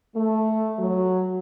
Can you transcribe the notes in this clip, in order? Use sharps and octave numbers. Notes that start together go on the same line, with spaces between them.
A3
F#3